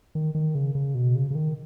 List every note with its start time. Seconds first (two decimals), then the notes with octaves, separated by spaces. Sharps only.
0.15 D#3
0.35 D#3
0.55 C#3
0.75 C#3
0.95 B2
1.15 C#3
1.31 C#3
1.35 D#3